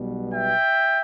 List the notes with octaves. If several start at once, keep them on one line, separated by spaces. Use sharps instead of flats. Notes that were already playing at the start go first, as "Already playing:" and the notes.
Already playing: B1 B2 G3 B3
E5 G5